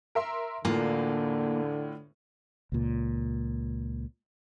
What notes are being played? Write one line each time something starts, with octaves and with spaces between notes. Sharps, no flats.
A#4 E5 C6
E2 A2 D3 A#3 D4 F4
C#2 A#2